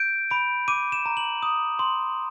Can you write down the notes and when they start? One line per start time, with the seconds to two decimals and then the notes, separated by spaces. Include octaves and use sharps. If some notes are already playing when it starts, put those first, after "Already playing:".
Already playing: G6 D7
0.31 B5 D7
0.68 D6 D#7
0.92 E7
1.06 A#5
1.17 F#7
1.43 D#6
1.79 C6